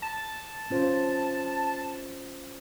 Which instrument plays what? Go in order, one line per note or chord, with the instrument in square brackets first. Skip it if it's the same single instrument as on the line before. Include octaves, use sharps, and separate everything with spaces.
[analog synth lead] A5
[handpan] C#4 F4 C5